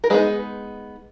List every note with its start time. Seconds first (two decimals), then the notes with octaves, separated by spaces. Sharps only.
0.04 A#4
0.10 G#3 B3 D#4 G#4 B4